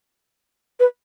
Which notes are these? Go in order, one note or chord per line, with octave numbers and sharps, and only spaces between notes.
B4